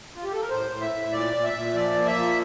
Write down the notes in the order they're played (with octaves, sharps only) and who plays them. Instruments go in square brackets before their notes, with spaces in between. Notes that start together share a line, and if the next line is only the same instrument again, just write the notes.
[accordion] F4
G4
A4
A#4
A2 C5
A2
E5
A2
A#2 D5
A#2
E5
A#2
F3 D5
A#3
E5
F3